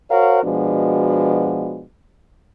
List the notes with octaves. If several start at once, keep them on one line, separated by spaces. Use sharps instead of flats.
F#4 A#4 C5 C#5 F5 F#5
B2 F3 G#3 B3 D4 F#4